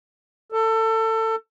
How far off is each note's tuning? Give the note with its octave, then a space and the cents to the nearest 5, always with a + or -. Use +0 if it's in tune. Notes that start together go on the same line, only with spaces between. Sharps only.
A4 +25